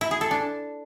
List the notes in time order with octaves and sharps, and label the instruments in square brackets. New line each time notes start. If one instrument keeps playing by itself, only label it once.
[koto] E4
G#4
A4
D4